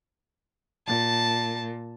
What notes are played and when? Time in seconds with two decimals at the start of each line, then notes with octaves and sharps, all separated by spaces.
0.87 A#2 A5